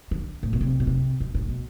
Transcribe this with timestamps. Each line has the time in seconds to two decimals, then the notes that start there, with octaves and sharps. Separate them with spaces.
0.11 D3
0.43 A2
0.53 B2
0.61 C3
0.80 B2
0.87 C3
1.20 G#2
1.35 A2
1.48 B2